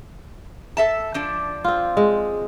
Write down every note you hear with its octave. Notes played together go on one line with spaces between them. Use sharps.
A4 E5 A5
F3 D4
C4 F4
G#3